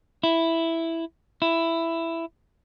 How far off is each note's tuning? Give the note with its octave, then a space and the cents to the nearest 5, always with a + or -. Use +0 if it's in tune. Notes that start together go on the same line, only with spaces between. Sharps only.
E4 +0
E4 +10